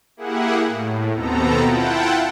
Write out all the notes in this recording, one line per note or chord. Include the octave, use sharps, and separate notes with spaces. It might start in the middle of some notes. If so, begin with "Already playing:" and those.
A#3 E4 G4 G#4 F#5
A2
D#2 B2 B3 C4 A4 A#5
E4 F4 F#5 G5 A5